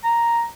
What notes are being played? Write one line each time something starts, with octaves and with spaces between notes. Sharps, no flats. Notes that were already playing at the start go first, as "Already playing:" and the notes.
A#5